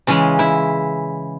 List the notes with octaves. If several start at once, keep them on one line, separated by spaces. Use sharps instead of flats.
C#3 E3 G#3 C#4
E4